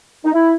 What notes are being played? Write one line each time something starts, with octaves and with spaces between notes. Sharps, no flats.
D#4
E4